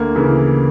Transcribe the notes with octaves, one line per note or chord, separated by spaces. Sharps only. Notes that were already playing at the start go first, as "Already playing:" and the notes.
Already playing: D2 A#3
C#3 E3